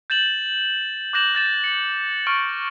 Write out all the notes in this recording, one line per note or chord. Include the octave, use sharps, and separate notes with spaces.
G6 A6 E7 F#7
D6 F#6 G6 A#6 E7 F#7
G6 A6 E7
C#7
C#6 F6 D7